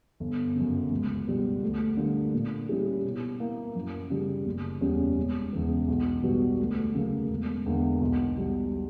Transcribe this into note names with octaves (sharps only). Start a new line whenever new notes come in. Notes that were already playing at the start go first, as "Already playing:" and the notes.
G1
F#2 C#3
C#2
B2 G3
D2
D3 G3 A#3
A#2
G3 C#4 E4 G4
B2
A#3 E4
F#2
C#3 G3
F#1
E2 C#3 G3 C#4
E1
E2 C#3 E3
B1
B2 G3 B3 F#4
D2
C#3 F#3 A#3
E1
E2 D3 A#3
B1
B2 G3